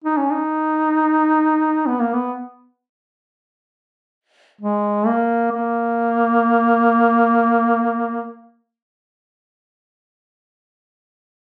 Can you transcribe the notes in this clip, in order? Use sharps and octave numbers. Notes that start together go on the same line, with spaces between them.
D#4
C#4
D#4
B3
A#3
B3
G#3
A#3
A#3